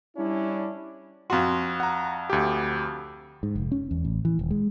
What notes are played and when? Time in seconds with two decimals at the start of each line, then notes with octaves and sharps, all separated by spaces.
0.17 G3 C#4 D4 E4
1.30 F2 F#4 C6
1.80 F#5 A#5
2.30 D2 G4
3.43 G#2
3.55 F1
3.72 C#4
3.91 E2
4.05 A1
4.25 E3
4.39 D#1
4.51 G#3